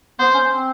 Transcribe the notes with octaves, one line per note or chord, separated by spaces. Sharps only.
B3 C5
C#4
C4